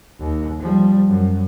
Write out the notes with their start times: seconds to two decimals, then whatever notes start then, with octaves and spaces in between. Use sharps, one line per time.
0.19 D#2
0.60 F3 G3
1.08 F#2